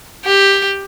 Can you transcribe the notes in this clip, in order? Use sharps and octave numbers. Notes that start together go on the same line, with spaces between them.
G4